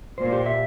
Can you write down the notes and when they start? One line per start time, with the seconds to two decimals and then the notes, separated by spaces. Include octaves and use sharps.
0.18 A#2 C5
0.33 G4
0.46 E5